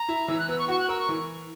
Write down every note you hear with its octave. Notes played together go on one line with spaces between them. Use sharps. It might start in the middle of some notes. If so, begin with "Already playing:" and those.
Already playing: A#5
E4
E3 E6
F#6
B3 E6
C#6
F#4 C#6
F#6
A#4 E6
C#6
E3